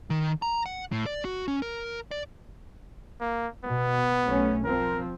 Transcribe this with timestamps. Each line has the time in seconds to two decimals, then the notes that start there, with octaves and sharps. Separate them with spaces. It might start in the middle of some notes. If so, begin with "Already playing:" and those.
0.10 D#3
0.42 A#5
0.66 F#5
0.92 A2
1.06 D5
1.25 F#4
1.48 C#4
1.62 A#4
2.11 D5
3.21 A#3
3.65 B2 B3
4.24 B1 A3 C#4
4.64 F3 C4 A#4